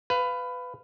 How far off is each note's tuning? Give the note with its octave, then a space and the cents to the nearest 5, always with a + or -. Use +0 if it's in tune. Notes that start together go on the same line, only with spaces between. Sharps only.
B4 +15 F5 +0